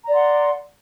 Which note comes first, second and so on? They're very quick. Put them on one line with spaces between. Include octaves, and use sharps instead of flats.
A#5 D5 C6 F#5